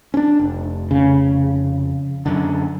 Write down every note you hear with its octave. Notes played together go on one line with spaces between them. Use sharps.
C#4 D4
F1
C#3
F#2 D3